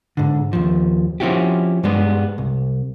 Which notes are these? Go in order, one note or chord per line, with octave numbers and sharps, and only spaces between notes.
G#2 D3
D#2 F3
F3 C4 C#4 E4 F#4 G4
G2 G3 G#3 B3
C2